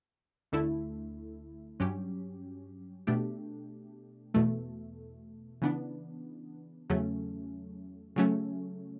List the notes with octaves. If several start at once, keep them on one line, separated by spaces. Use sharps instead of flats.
D2 D3 A3 E4
G2 F#3 C#4 G4
B2 A3 D4 G4
E2 B2 A3
C#3 E3 B3 D4
E2 C#3 F#3 A3 C#4
C#3 F#3 A3 C#4